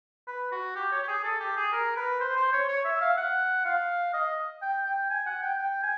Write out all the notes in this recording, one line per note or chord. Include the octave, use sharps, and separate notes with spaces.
B4
F#4
G4
C#5
G4
G#4
A4
G4
G#4
A#4
B4
C5
C5
C#5
C#5
E5
F5
F#5
F5
D#5
G5
G5
G#5
F#5
G5
G5
G#5